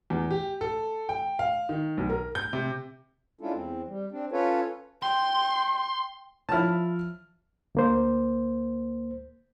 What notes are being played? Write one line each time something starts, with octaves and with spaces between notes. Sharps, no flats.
E2
G4
A4
G5
F5
D#3
B1
A#4
G6
C3
G#3 C#4 D4 E4 F4 A4
E2 C4
G3
C4 D4
C#4 F4 A4 B4 C#5
G5 C6
F3 E4 C#5 A5 F6
D2 A#3 C5